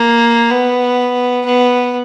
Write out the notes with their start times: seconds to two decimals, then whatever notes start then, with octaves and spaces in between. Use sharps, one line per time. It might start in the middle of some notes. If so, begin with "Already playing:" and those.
Already playing: A#3
0.51 B3
1.45 B3